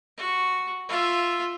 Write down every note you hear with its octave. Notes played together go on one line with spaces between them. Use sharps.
F#4
F4 E5